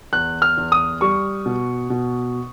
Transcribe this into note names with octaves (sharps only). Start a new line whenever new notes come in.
E2 F#6
F6
E2
D#6
G3 C#6
B2
B2